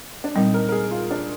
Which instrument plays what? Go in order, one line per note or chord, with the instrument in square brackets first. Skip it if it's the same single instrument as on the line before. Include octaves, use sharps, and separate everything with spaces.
[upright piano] D4
[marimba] A#2 G3 C4 [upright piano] D#4
[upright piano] A#4
A#4
G#4
F4
D4